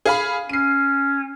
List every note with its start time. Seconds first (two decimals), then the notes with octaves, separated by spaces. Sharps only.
0.06 G#4 F5 B5
0.49 C#4 C7 D#7